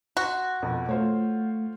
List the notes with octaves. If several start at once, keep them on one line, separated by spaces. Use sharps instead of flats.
F#4 C6
F2 B2
A3 F4 C5 C#5